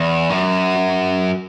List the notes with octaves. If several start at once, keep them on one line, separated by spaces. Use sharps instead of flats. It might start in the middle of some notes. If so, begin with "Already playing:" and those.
Already playing: E2
F#2